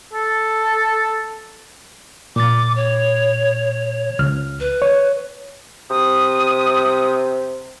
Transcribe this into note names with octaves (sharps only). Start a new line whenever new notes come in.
A4
A#2 D6 A6
C#5
C#2 F6
B4
C#5
C3 D#6